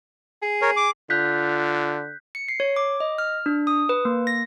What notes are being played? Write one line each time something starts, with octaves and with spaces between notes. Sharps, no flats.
G#4
A#4 C#5
D6
D3 F4 F#6 G6 B6
C#7
C7
C#5
D6
D#5
F6
D4
D#6
B4
A#3
A#6